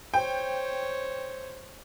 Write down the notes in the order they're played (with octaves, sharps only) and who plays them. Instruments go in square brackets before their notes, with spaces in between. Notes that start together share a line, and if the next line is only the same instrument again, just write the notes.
[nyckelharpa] C5 C#5 [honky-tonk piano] G5